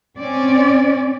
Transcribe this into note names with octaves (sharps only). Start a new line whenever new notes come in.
C4 C#4 D5